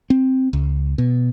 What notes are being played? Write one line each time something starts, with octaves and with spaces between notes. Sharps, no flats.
C4
C#2
B2